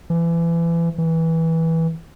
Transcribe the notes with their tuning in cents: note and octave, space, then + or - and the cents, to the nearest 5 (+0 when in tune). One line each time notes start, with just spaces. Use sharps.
E3 +30
E3 -15